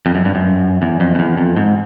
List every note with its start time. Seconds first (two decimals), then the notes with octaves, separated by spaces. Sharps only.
0.06 F2
0.15 F#2
0.25 G2
0.35 F#2
0.82 E2
1.00 F2
1.15 F2
1.19 E2
1.38 F2
1.57 G#2